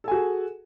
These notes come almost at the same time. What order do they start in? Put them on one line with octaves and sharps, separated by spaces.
A4 G#5 F#4 G#4